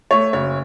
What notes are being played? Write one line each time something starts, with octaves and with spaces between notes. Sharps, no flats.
A3 C#5
F#1 C#5